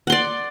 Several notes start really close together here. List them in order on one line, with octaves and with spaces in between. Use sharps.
F#5 C6 D5